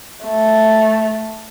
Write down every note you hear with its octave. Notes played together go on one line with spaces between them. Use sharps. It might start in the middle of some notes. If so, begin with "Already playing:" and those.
A3